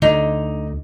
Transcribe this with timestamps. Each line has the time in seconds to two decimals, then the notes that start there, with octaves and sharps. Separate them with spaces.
0.02 D2 D3 D#4